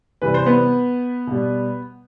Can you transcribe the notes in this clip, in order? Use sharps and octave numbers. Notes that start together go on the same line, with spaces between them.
C3 E3 G3 B4
C5
B3 B4
B2 G3